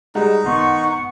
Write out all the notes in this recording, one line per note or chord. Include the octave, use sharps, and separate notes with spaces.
G3 G#3 D#4 F#4
D#3 B3 F#5 C6 C#6